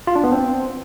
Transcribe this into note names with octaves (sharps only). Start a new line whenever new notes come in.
F4
D4
B3
C4